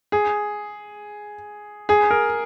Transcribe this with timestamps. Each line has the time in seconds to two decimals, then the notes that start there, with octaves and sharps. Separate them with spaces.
0.12 G#4
1.89 G#4
2.11 A#4